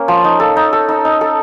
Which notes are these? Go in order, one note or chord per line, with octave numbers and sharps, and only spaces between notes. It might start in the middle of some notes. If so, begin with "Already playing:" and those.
Already playing: A#3 C#4
F3
D#4
A4
D#4
A4
D#4
D#4
A4